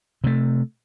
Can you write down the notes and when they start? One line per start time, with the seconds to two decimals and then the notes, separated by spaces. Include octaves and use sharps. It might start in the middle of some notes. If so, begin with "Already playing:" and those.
0.24 C3 A3